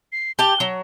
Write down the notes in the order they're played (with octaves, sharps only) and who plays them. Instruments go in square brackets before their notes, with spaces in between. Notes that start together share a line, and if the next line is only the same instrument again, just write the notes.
[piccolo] C7
[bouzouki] G4 A5 [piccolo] G7
[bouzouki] F#3